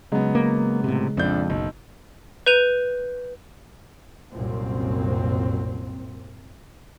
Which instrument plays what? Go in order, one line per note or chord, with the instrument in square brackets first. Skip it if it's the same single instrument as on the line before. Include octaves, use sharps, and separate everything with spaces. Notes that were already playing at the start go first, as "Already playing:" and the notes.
[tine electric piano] C#3 G#3 [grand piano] F#3 B3
[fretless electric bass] A#3
A2 C3
[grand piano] A#1 D4 G6 [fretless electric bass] F2
[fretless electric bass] F#1 [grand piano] B1
[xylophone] B4 G6 D#7 F7
[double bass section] C2 F#2 A#2 C4